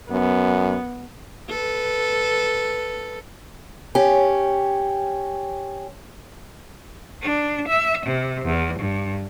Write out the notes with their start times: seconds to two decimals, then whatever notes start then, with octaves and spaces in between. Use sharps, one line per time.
0.11 F#2 B3
1.49 A4 B4
3.95 C#4 G4
7.23 D4
7.69 E5
8.06 C3
8.44 E2
8.78 G2